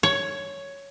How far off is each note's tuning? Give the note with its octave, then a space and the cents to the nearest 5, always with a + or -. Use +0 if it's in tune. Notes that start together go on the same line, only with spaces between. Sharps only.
C#5 +5